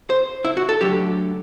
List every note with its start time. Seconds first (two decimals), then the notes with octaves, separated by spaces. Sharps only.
0.10 C5
0.44 E4
0.57 F#4
0.69 A4
0.81 D2 D3 F#3 G4